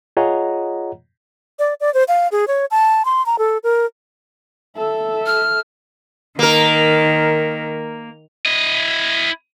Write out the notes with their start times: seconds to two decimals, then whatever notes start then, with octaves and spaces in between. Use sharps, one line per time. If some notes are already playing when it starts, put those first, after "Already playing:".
0.17 F4 G#4 C#5 D#5 F#5 A#5
1.59 D5
1.81 D5
1.94 C5
2.08 F5
2.32 G#4
2.48 C#5
2.71 A5
3.05 C6
3.26 A#5
3.39 A4
3.64 A#4
4.77 A4 E5
5.26 F6
6.39 D#3 A#3 A#4
8.46 E4 D#5